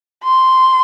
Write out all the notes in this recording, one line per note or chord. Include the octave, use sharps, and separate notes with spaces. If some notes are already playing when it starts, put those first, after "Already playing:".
C6